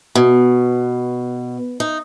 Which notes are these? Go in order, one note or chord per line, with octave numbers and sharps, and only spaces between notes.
B2
D#4